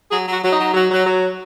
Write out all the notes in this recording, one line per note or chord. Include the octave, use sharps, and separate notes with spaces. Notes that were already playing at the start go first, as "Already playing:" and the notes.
F#3 G#4
F#3
F#4
F#3
F#3 D#4
F#3
F#3
F#3